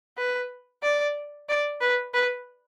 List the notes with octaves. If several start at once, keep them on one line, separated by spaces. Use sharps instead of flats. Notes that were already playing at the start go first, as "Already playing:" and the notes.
B4
D5
D5
B4
B4